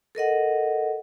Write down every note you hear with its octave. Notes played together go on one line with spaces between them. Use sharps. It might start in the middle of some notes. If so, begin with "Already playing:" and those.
A4 A#4 D#5 F#5